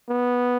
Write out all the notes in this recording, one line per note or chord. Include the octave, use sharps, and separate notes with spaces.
B3